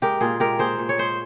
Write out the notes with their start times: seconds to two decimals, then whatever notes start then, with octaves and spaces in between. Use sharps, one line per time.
0.02 G#3 G4 A#4
0.21 A#2 F4 G#4
0.40 G#3 G4 A#4
0.59 A#2 G#4 C5
0.79 A#2
0.89 C#5
0.98 G#3 C5